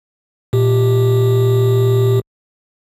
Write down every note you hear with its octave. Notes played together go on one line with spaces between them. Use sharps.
A#2 G4